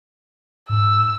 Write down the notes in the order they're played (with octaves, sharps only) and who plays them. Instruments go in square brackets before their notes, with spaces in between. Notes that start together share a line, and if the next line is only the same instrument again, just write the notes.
[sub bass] G#2 [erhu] E6